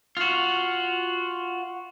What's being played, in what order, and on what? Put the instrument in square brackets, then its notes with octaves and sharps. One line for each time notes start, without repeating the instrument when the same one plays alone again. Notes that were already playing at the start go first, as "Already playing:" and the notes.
[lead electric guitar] F4 F#4